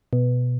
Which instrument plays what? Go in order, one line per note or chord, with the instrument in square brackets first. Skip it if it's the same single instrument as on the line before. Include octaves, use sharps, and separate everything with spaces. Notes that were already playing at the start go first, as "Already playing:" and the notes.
[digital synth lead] B2